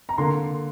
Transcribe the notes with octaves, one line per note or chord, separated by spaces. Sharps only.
A#5
D3 A#3 C6